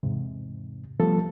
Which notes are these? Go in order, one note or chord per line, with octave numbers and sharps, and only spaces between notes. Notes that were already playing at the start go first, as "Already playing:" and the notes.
E2 G#2 C3
F3 G3 A3 B3 A4